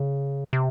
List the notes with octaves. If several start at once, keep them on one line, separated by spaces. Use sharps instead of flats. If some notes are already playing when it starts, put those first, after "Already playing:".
Already playing: C#3
C3